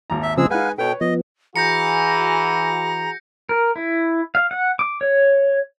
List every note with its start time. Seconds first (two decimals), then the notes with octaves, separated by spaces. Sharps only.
0.10 G#1 D#2 A#5
0.23 E5
0.38 C#3 F3 G#3 C4 G#4 E6
0.50 G#3 D#4 B4 F5 F#5 G#5
0.78 B2 A4 B4 C#5 G5
1.01 F3 B3 D#5
1.56 E3 F#4 G#4 A#5 G6 A#6 C#7
3.49 A#4
3.76 E4
4.35 F5
4.51 F#5
4.79 D6
5.01 C#5